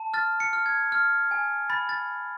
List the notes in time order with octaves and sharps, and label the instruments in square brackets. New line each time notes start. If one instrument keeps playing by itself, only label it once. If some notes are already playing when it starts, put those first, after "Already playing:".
Already playing: [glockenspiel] A5
F6 A6
C#7
F6
G#6
F6
G#5
B5 A6
A6